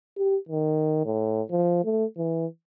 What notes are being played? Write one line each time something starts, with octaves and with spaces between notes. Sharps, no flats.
G4
D#3
A2
F3
A3
E3